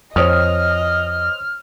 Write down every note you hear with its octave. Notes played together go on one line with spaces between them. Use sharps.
F2 C5 C#5 D#5 D#6 F6